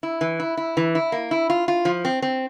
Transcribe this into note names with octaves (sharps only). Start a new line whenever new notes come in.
E4
E3
E4
E4
E3
E4
A#3
E4
F4
F4
F3
C4
C4